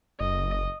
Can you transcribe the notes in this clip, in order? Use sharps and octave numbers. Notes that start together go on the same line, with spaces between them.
F#1 D#5